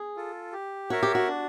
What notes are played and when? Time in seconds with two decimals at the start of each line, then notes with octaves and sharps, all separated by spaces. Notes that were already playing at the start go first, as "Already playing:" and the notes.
Already playing: G#4
0.16 F4 A4
0.53 G4
0.90 F#4 A#4 C#5 E5
1.03 G4
1.15 F#4
1.28 D4